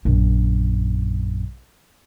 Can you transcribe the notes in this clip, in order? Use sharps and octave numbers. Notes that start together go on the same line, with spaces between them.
A#1 F#2